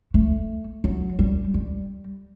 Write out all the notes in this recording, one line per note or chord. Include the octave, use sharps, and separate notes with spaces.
A3
F#3
G3
G3